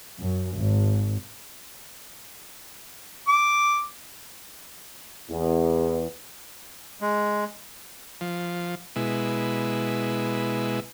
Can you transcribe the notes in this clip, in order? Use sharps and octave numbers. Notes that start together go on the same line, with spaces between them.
F#2
G#1
D6
E2
G#3
F3
B2 G#3 E4